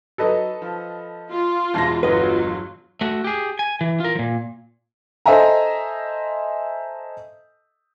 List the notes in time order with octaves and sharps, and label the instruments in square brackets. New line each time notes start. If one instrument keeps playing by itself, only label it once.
[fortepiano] F#3 D#4 [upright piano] A4 B4 D#5
[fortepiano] F3
[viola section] F4
[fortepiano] E2 G#2 B2 [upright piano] A5 A#6
[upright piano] G1 [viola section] F#3 F4 [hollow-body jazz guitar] B4 D#5
[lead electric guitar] A3 F#4
G4 G#4
G#5
E3
F4 A#4
A#2 F3
[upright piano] A4 C5 D#5 E5 G#5 A#5